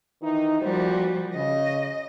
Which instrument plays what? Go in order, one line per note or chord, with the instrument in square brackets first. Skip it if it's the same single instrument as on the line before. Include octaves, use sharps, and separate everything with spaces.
[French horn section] D#3 E3 D#4
[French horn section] A#2 F#4 C5 [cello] F3 G3
[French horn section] C#3 [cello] D#5